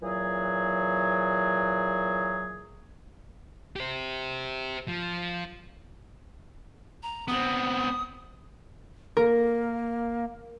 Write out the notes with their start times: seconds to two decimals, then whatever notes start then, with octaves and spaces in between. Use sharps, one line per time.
0.03 A#2 E3 F#3 G#4
3.76 G4 C5
4.88 F3
7.03 A#5
7.28 B3 C4 D#6
9.17 A#3 A#4